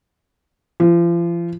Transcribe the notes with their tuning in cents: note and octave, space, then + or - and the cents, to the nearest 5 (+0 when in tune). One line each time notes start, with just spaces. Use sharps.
F3 -40